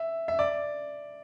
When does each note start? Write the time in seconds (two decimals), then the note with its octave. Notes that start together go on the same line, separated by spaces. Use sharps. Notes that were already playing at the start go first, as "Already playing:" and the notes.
Already playing: E5
0.28 E5
0.39 D5